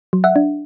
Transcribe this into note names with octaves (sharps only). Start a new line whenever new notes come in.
F#3
E5 F#5
D4